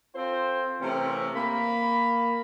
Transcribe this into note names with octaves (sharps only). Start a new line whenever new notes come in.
C4 F4 A4 C5
C3 E3 A3 C4 C#4 A#4
A#3 B5